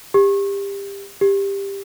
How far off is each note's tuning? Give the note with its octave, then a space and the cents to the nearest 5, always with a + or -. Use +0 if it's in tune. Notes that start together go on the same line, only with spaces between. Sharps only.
G4 +25
G4 +15